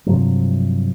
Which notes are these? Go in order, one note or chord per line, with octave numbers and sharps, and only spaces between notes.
G2 C3 F3 F#3